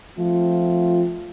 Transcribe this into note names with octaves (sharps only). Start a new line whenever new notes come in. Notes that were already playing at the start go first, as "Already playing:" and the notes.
F3 A3 C4 F4